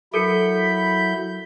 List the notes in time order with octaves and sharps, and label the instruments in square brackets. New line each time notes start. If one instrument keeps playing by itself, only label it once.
[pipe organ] F#3 E4 G6 [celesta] A4 A#4 C#7 [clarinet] B5